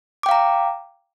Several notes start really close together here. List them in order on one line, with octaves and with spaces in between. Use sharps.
D6 G5 F5 A#5